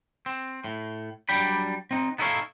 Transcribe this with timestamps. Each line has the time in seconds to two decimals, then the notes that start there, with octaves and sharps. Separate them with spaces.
0.26 C4
0.64 A2
1.29 F#3 G3 D4 G5 B5
1.91 C4 D#4
2.18 B3 D#4 E4 A4 C#5 F5